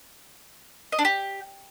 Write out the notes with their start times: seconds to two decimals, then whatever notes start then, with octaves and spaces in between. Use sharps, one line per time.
0.92 D#5
0.99 D4
1.05 G4